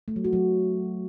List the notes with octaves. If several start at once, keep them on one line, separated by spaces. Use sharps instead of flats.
A3
F#3
F#4
F#3